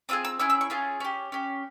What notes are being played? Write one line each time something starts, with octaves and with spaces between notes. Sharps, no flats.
C4 F4 G#4 E6
E6
C#4 E4 G#4 E6
E6
C#6
C#4 F4 G#4
C#4 G4
C#4 G4